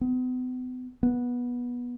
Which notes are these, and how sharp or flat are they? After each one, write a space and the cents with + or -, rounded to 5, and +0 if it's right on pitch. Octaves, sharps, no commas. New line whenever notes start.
B3 +40
B3 -15